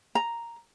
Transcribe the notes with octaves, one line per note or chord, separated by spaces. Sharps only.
A#5